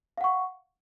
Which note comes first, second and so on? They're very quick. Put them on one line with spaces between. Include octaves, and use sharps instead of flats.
F5 F#5 C#6